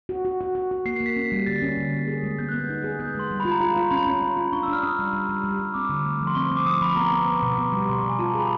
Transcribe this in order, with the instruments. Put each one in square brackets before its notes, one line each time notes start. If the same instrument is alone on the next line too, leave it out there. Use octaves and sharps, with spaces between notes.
[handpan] F#4
F#4
F#4
F#4
F#4
[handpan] A#3 [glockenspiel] C7
[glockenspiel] C7
[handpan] A#3
[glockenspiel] B6
[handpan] C#4
G3
[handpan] D3 [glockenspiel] A6
[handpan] C#4
D3
A#3
G#4
G#3
[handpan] B3 [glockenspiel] G6
[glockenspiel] F#6
[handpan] B3
[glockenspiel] G6
[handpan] D#4
G#4
[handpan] B3 [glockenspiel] G6
[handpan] G#3 [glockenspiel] C6
[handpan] G3
[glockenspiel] B5
[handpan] F4
[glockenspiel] A#5
[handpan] F4
F4
[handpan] C#4 [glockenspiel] B5
[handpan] C#4
C#4
F4
[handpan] D4 [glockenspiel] C#6
[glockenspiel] E6
[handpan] D4 [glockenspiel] F6
[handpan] D4 [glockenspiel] D#6
[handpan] G3
G3
G3
G3
G3
[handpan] C4 [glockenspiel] D6
[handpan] D3
A3
F3
[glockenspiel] C6
[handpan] C4 [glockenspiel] C#6
[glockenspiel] C#6
[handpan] C4
[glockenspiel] D6
[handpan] F3 [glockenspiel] D#6
[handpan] F3 [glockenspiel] B5
[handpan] B3 [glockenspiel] A#5
[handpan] B3
B3
B2
B3
G3
[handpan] B2 [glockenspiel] C6
[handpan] B2 [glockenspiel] C#6
[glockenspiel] G#5
[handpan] F4 [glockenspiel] A5
[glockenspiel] A#5
[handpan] G#4 [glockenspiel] B5